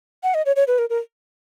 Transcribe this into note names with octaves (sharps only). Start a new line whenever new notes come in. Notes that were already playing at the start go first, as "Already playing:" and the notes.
F#5
D#5
C#5
C#5
B4
A#4
A#4